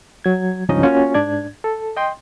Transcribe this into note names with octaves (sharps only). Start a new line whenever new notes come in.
F#3 G#6
C#2 G2 F3 C#4 D#4 D#5
A#3 C#4 F4 F#4
G#2 D4 D5 G#6
A4
D#5 G5 C6